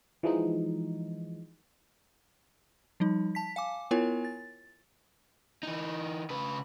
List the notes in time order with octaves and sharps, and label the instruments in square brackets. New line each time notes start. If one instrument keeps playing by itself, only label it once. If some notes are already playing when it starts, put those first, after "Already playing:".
[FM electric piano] E3 F3 G#3 D#4
[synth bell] F3 G3 D#4
A5 B6
F5 G#5 D6
B3 E4 F4 A#4 C#5 G#5
A6
[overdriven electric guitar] E3 D#4
C#3 B4